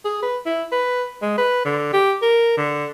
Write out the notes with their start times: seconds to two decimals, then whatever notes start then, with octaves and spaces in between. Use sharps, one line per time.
0.05 G#4
0.23 B4
0.46 E4
0.72 B4
1.22 G#3
1.38 B4
1.65 D3
1.93 G4
2.22 A#4
2.57 D3